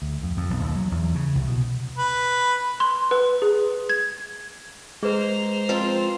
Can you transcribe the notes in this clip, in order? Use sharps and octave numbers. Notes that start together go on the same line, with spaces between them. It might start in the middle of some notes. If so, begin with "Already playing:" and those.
D2
F2
F2
B1
D#2
F#3
E2
C#3
C2
B2
B4
C6
B4
G#4
G#6
G#3 G#4 B4 C5 A#5
F3 C4 F4 B4